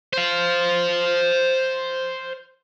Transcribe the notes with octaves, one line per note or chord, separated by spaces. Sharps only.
C5 F5